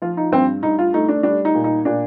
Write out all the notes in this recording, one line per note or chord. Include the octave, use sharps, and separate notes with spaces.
F3 F4
D#4
G2 C4
G2 D#4
F4
A3 D#4
D4
G3 D4
D#4
A#2
D#4
A#2 D4